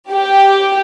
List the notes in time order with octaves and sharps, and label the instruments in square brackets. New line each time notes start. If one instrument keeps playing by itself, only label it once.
[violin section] G4